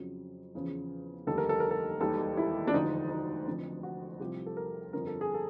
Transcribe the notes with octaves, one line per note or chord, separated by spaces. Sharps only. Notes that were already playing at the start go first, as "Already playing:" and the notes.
Already playing: F2 C#3 F#3
E2 C#3 F3
F1 D#2 D3 G3 A4
A#4
A4
A#4
A4
E1 D#2 D#3 G3 A4
E4
D4
E1 D2 D3 F3 D#4
D#4
F1 F2 D3
F#4
C2 C3 F3 G4
A4
A#4
G1 F2 D3 A#4
A4
G#4
A4